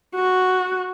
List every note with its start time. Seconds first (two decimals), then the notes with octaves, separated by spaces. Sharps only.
0.15 F#4